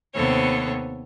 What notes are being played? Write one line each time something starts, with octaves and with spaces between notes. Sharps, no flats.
D#2 C3 B3 A4 C5 C#5